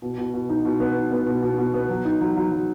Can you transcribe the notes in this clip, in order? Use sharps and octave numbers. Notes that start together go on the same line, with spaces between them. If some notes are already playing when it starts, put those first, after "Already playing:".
B2
B2
B2
D#4
B2
B3
D#4
B3
B2
B2
B2
B3
F#3
D#4
F#3
F#3
F#3